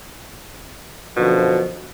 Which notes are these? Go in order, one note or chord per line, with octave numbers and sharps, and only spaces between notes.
F#2 B2 D3 F3